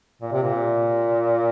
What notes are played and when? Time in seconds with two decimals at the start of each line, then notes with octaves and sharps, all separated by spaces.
0.21 A#2
0.32 C3
0.42 A#2